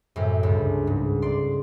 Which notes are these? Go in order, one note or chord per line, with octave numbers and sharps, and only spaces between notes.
F#2 A2 C3
C#2 G2
G#2
D5 C6